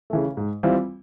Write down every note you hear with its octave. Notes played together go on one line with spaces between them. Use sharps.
C#3 E3 A3
G#2
E3 G3 C4 F4